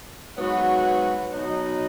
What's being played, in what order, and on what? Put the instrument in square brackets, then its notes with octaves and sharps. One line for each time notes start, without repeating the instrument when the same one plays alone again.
[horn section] G#2 F#3 B3 F#4 B4
B2 F#3 D#4